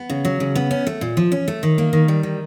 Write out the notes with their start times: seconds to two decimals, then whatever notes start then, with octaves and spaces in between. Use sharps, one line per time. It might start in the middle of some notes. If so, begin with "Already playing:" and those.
Already playing: B3
0.10 C#3
0.25 F#3
0.40 C#3
0.55 B3
0.71 C#4
0.87 A3
1.01 A#2
1.17 F3
1.32 C#4
1.48 A3
1.63 D#3
1.78 A#3
1.93 D#3
2.08 G3
2.23 D#3